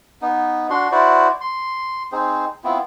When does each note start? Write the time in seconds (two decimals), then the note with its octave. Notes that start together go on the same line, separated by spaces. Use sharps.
0.22 B3 D#4
0.70 D4 F#4 C6
0.92 E4 F#4 C5 D5
1.41 C6
2.12 C4 D#4 G#4 C5
2.64 B3 C4 E4 F4